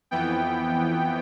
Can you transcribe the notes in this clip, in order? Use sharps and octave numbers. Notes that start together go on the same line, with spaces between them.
F2 E3 B3 G5